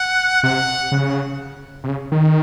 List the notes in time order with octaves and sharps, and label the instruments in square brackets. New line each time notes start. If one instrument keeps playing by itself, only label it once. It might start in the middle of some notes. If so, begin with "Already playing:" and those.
Already playing: [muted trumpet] F#5
[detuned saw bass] C3 [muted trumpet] F#5
[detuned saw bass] C#3
C3
C#3
D#3